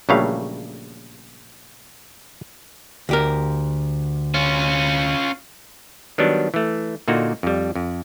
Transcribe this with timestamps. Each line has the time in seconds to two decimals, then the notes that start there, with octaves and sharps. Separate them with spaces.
0.09 A#1 C#3 F#3 G3 A3 F5
3.09 D2 G4 A#4
4.34 C#4 F4
6.18 D#3 F#3 G3 B3 D4
6.54 E3 A3
7.08 A#2 D3 A#3 D#4 F#4
7.43 F2 G3
7.75 F2